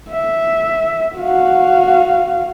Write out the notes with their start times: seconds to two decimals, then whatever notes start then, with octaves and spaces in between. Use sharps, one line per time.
0.11 E5
1.17 F#4 F5